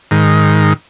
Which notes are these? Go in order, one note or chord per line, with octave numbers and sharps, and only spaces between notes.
G#2 D#3